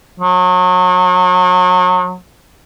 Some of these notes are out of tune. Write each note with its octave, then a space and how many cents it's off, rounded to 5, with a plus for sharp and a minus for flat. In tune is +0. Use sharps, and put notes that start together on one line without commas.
F#3 -30